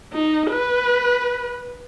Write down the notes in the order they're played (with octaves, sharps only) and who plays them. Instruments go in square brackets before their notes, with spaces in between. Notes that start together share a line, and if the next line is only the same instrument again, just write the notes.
[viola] D#4
B4